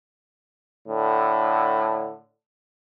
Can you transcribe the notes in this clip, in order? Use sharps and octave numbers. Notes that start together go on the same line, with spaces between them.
A2 D3